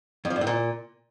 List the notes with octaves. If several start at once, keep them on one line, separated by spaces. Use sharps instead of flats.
F2
F3
G2
A2
A#2